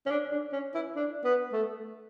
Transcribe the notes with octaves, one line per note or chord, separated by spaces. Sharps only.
C#4
D4
D4
C#4
E4
D4
B3
A3